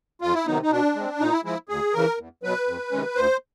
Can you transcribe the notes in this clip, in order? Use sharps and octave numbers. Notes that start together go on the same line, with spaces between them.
F2 F4
E4
C3 D#3 F#3 B3 D#4
D#4
B2 D4
G#3 C4
A#2 D#4
E4
F3 G#3 E4
D2 G#4
C#3 E3 A#4
E2
B2 F#3 B4
F2
C3 D#3 G#3 C#4
D2 C5